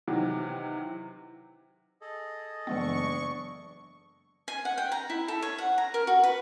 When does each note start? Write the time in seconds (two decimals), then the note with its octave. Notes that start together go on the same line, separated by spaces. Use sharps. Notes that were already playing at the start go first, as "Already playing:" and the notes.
0.08 C3 D#3 E3 F#3
2.01 G#4 A4 D#5
2.67 F#1 E3 G#3 B3 D4 C#6
4.48 G#5
4.65 F#5
4.78 G5
4.92 A#5
5.10 E4
5.28 A4
5.42 C#5
5.58 F#5
5.78 A#5
5.94 A#4
6.07 F#4
6.23 B4